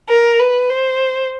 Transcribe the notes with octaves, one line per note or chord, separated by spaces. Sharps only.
A#4
B4
C5